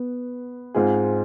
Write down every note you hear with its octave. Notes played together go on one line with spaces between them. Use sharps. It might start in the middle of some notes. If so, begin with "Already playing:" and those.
Already playing: B3
G#2 G#3 C4 F4 G#4